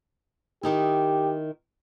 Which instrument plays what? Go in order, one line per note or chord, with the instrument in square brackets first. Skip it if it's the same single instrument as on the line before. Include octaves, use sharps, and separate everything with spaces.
[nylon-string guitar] D#3 D#4 E4 [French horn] G4